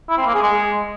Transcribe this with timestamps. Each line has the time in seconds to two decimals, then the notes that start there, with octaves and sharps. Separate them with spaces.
0.09 E4
0.17 C4
0.26 A#3
0.34 G#4
0.42 G#3